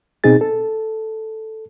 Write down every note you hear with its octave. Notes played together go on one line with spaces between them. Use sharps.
B2 C4 D#4 G#4 A6
A4